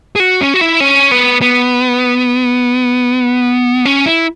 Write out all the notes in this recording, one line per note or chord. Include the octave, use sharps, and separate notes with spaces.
G#4
F#4
C#4
F#4
E4
C#4
B3
B3
C#4
E4